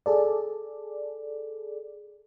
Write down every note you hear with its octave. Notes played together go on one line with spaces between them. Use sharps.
G#4 A4 D5